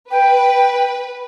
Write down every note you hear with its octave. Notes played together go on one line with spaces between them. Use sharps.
B4 G5